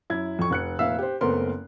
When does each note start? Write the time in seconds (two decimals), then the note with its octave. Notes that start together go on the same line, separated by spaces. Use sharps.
0.10 F#2 E4 G#6
0.39 F2 C#6
0.51 F1 F#6 C#7
0.79 F1 A#2 E5 F5 E6
0.99 G4 C5
1.21 F#1 A3 B3 C4 A#4 C6